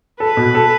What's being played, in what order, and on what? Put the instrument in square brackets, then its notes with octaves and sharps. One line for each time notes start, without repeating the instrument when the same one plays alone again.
[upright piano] A4 [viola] B4
[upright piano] B2
A4